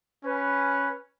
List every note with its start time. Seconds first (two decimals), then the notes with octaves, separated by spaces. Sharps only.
0.25 C#4 B4